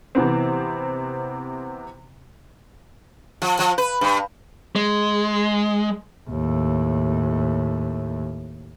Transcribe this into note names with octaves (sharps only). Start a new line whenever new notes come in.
C3 E3 B3 C4
F3
F3
B4
G2
G#3
D#2 A2